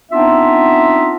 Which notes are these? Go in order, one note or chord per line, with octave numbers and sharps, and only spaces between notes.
B3 C4 D4 D#4 F4 E5